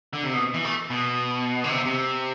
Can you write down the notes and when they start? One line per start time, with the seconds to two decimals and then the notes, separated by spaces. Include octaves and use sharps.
0.13 D3
0.24 C3
0.33 B2
0.54 E3
0.64 A3
0.90 B2
1.64 D3
1.70 C3
1.85 C3